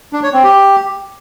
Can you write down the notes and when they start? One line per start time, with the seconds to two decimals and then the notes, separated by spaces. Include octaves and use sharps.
0.13 D4
0.23 C#5
0.33 C4
0.43 G4